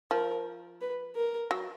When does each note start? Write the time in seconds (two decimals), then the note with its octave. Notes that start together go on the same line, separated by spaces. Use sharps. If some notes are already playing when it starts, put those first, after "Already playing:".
0.11 F3 A#4
0.81 B4
1.16 A#4
1.51 F#3